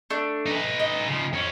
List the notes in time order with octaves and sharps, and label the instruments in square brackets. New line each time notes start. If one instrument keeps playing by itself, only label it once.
[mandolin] A3 D4
[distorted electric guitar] D#4 B4
[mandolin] D#5
[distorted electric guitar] C#3 F3
F2 C#4